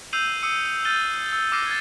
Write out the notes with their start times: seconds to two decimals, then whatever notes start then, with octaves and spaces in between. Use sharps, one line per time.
0.13 E6 G6 C7 D#7 F7 F#7
0.42 D#6 E6 C#7 D#7
0.85 F6 G6 A6 D#7 G7
1.33 E6
1.52 D6 E6 F6 A#6 C7 D#7
1.67 G#6 A6